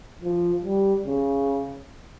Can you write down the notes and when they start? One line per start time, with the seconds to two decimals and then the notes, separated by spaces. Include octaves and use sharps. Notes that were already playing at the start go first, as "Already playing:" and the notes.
0.22 F3
0.64 G3
1.06 C#3